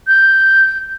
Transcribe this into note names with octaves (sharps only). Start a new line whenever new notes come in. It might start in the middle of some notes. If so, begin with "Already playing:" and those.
G6